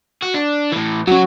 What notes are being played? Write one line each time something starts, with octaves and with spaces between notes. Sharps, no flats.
F#4
D4
A2 E3
F#3 C#4 F#4 C#5